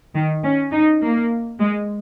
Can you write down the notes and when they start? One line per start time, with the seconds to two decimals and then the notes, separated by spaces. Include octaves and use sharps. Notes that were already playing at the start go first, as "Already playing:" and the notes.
0.15 D#3
0.44 C#4
0.73 D#4
1.02 A#3
1.60 G#3